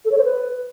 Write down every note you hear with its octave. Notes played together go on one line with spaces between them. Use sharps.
A4
C#5
C5
B4